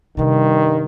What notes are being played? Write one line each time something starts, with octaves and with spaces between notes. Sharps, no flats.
G2 C3 D#3 G3